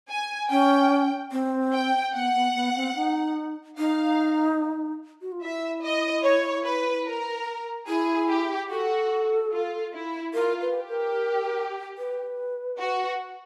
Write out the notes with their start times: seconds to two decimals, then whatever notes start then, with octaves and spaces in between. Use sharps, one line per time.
0.09 G#5
0.50 C#4 G5
1.32 C4
1.73 G5
2.14 B3 F#5
2.34 B3
2.55 B3
2.76 C4
2.96 D#4
3.78 D#4 F5
5.21 F#4
5.32 F4
5.42 E4 E5
5.82 D#5
6.23 C#5
6.64 B4
7.06 A#4
7.88 E4 G#4
8.29 G4
8.70 F#4 A4
9.52 F4
9.93 E4
10.34 F4 A#4
10.61 B4
10.75 G4
10.89 A#4
11.98 B4
12.79 F#4